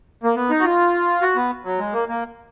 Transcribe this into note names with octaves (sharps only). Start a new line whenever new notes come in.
A#3
B3
D#4
F#4
F4
F#4
B3
F#3
G#3
A#3
A#3